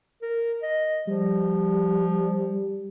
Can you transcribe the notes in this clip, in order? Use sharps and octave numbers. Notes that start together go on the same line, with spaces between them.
A#4
D#5
F3 G3